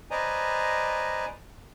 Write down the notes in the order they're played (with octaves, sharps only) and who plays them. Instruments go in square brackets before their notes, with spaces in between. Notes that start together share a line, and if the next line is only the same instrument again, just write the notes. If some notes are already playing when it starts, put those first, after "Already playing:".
[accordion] B4 C5 D5 D#5 G#5 A#5